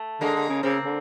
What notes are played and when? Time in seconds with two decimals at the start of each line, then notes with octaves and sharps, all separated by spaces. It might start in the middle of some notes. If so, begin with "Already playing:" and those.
Already playing: A3
0.21 D3 G#3 A#3
0.35 D3
0.49 C#3
0.63 C#3 A#3 C4
0.85 D3